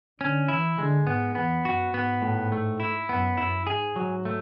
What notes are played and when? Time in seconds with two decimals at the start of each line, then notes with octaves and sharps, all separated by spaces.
0.20 D3 C#4
0.48 E3 E4
0.78 D3 G#3
1.07 G#2 B3
1.35 E2 B3
1.64 F#2 F#4
1.94 G#2 B3
2.22 A2
2.52 A3
2.80 E4
3.09 F#2 B3
3.37 F#2 E4
3.66 G#2 G#4
3.96 G#2 F#3
4.25 A3